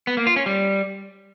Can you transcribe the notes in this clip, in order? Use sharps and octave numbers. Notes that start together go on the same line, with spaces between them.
B3
A#3
F4
C#4
G3